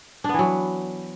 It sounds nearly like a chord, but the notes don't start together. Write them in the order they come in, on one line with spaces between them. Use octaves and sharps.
D4 B3 E3 F#3